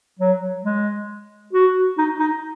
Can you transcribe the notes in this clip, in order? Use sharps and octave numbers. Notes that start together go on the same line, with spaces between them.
F#3
G#3
F#4
D#4
D#4